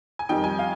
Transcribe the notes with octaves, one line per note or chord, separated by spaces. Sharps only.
G#5
F2 D#3 G3 G5
G#5
F5